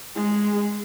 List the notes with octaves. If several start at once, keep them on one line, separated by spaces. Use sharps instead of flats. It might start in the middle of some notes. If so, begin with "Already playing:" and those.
G#3 G#4